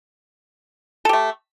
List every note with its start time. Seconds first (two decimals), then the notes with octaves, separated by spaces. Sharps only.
1.05 A4
1.09 G4
1.13 A3